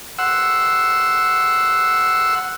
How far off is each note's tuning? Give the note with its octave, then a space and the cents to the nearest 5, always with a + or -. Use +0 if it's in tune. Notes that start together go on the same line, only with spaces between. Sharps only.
F#5 +0 C6 +0 E6 +0